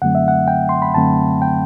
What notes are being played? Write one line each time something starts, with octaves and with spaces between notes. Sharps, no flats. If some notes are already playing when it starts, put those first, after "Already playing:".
F#2 D3 F#3 A3 C4 F#5
E5
F#5
G5
C6
B5
F#2 D3 F#3 A3 C4 A5
G5